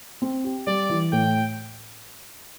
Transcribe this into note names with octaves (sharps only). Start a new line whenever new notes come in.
C4
G4
G3 D5
E3
A2 G5